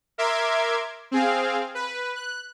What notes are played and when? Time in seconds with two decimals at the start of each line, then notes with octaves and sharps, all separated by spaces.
0.18 A#4 E5 C6 D6 G#6
1.11 C4 G#4 F5
1.75 B4
2.15 F#6